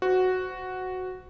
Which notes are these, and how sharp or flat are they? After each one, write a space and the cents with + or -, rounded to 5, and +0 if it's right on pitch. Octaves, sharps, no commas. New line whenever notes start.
F#4 +0 C5 -30